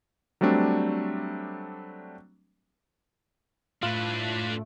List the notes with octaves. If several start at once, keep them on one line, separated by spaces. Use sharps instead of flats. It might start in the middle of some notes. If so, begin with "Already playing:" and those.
F#3 G3 A3 C4 D4
A2 A3 D4 F4 B4